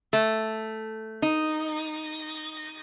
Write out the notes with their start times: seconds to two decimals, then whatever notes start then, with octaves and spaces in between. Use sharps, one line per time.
0.13 A3
1.22 D#4